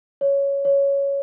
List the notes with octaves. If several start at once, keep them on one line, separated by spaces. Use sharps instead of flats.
C#5
C#5